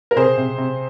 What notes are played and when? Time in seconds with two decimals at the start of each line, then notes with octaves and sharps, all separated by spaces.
0.11 A#4
0.16 C3 G#4 C5
0.37 C3
0.58 C3